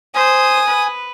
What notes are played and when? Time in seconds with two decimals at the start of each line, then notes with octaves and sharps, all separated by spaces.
0.15 C5 G#5 D#6
0.68 B4